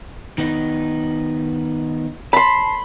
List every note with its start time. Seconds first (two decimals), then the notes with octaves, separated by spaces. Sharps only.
0.38 D#3 B3 D#4
2.33 A5 B5 C6